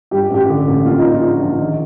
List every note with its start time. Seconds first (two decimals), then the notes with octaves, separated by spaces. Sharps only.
0.11 G2 G4
0.30 A1 G4
0.49 D3
0.68 A1
0.86 A#2 F4
0.99 D#4
1.04 A#2
1.12 F4
1.22 A#1
1.42 A#1
1.60 D#3